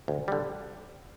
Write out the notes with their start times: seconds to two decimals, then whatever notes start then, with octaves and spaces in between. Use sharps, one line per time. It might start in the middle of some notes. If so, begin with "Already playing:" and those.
0.08 D2
0.28 D3 G3